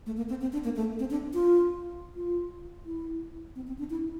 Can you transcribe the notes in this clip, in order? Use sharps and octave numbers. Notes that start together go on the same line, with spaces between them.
A3
A#3
C4
C4
D4
A#3
A3
C4
D4
F4
F4
E4
C4
C4
D4
E4